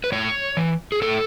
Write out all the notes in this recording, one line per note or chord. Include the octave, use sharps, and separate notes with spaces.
B4
A2 C#5
E3
G#4
A2 A4